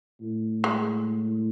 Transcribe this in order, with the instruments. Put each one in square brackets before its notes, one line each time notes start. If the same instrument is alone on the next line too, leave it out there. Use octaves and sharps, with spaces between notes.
[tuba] A2
[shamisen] G#3